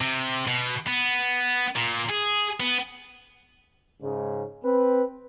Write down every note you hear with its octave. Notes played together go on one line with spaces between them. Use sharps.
C3
B2
B3
A#2
G#4
B3
G#2 C#3
C4 B4